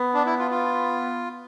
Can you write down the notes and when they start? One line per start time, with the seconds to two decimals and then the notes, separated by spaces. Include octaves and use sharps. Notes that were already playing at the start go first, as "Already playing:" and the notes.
Already playing: B3
0.14 D4
0.26 E4
0.39 F4
0.51 F4